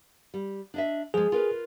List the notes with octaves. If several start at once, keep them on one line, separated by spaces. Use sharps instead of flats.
G3
D4 D#5 E5
F3 G#3 G#4
F4 A#4 B4